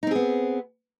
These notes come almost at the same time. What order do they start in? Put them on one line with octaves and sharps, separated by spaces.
D#4 C4 G#4 B3